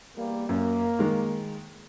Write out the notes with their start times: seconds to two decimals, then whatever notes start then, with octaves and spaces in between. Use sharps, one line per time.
0.16 E2 G3 A#3
0.49 F#2 A#3
0.99 D#3 G#3